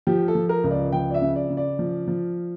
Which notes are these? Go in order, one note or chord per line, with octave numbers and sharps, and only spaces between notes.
F3 G4
A4
F3
A#4
C#2
D5
F3 G5
D5
E5
C#3
D5
C#3
D5
F3
F3